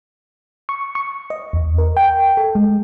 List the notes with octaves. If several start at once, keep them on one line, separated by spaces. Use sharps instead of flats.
C#6
C#6
D#5
E2
A#4
G5
A4
G#3